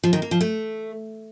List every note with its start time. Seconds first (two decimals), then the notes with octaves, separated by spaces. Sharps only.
0.04 F3
0.13 D#3
0.22 A#3
0.31 F3
0.41 A3